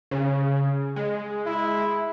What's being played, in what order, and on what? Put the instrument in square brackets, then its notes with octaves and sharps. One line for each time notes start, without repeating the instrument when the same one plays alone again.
[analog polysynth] C#3
G#3
[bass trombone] E4